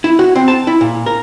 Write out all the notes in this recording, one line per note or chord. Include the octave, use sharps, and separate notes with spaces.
E4
F#4
C4
A5
E4
A#2
A#4